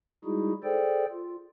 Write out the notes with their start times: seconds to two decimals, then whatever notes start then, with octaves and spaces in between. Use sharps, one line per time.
0.25 G3 G#3 D#4 E4 F#4 G#4
0.64 G#4 A4 C5 D5 G5
1.12 F4